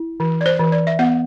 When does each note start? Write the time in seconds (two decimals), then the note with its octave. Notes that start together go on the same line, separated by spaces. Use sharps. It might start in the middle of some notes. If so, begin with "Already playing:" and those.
Already playing: E4
0.20 E3
0.41 D5
0.46 C5
0.59 E3
0.72 D5
0.87 E5
0.99 B3 F#5